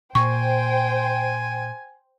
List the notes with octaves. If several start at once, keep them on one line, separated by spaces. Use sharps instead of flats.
A#2 C5 G5 G#5 C#6